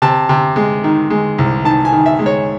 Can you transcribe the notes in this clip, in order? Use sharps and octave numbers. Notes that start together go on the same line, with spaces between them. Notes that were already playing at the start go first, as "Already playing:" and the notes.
C3 A5
C3
G#3
D#3
G#3
C2
D#3 A5
G#5
D#3
E5
G#3
C#5